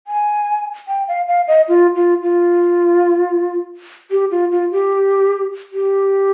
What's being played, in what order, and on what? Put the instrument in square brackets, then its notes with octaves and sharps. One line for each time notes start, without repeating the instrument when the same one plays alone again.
[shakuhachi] G#5
G5
F5
F5
D#5
F4
F4
F4
G4
F4
F4
G4
G4